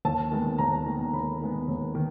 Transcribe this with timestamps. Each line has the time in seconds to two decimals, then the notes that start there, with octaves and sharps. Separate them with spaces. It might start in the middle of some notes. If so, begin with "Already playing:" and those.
0.05 D#2 A5
0.32 D#3 G#3 B3
0.58 D#2 A#5
0.86 D#3 G#3 B3
1.13 D#2 B5
1.41 D#3 G#3 B3
1.68 D#2
1.95 D#3